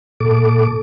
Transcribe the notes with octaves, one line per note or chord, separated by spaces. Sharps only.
A#2 A4 D6